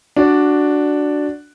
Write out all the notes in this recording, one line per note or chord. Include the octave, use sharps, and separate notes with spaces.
D4 F#4 D5